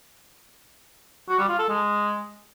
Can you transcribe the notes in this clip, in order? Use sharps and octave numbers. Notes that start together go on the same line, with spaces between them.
F#4
G3
F4
A4
G#3